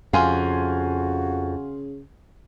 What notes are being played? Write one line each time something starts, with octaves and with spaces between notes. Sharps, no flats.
F2 C#3 F#4 F5 G#5 C6